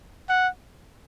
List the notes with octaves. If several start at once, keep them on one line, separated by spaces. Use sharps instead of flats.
F#5